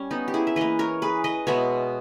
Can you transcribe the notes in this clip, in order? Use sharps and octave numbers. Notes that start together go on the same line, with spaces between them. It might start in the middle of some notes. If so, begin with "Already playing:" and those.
Already playing: G3 C#4
B3 D#4
G4
E4 G#4
E5
E3 A#3 B4 D#5
A#4 C#5
G#4 B4
B4 D#5
B2 G#3 B3 C#5 E5